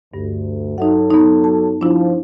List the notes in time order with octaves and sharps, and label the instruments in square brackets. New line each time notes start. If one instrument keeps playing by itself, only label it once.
[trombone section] D2 [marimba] G2
[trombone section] F#3 A4 [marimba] D#4 E5 F#5
[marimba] B3 D#4
A5
[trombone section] F3 [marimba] D4 E4